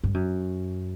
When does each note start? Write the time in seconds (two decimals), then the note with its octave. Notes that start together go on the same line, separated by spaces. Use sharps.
0.04 G2
0.14 F#2